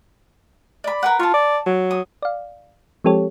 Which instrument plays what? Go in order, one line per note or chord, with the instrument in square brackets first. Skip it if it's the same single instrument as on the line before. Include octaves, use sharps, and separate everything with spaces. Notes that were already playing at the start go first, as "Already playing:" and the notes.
[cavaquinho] D5 B5
A#4 B4 F#5
[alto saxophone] F4 [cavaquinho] A5 C#6
[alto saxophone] D5
F#3
[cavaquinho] D#6
[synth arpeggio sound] D5 F5
F3 G#3 C4 G4 A4 C#5